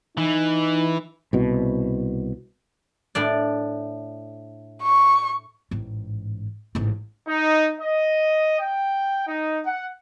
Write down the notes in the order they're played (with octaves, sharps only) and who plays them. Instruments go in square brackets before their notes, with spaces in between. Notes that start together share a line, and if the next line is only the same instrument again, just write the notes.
[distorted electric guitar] E3 [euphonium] D#4
[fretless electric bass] C2 B2
[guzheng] A2 D4 D5
[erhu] C#6
[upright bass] A1 G#2
A1 G#2
[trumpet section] D#4
D#5
G5
D#4
F#5